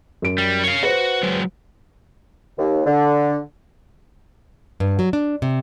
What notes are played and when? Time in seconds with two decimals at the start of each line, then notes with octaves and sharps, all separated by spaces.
0.22 F#2 D7
0.38 G3
0.63 C#5 F5
0.83 F#4 B4 C5
1.23 F#3 G#3
2.58 D#2
2.86 D3
4.80 G2
4.99 F#3
5.13 D4
5.42 C3